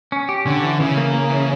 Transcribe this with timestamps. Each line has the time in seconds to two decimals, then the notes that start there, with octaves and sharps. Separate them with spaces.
0.12 C#4
0.29 G4
0.46 D3 C#4
0.63 E3
0.80 C#3 E3
0.97 A#3
1.14 A#3
1.30 E3